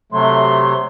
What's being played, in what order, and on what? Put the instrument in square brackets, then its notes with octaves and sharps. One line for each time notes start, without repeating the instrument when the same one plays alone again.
[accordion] C3 F#3 A3 [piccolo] C6